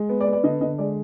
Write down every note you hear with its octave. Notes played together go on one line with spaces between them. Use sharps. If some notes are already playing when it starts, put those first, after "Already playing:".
Already playing: G#3
B3
D5
B3
D5
D3 D#5
D3 D#5
G#3 D5